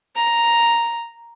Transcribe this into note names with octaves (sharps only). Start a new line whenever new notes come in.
A#5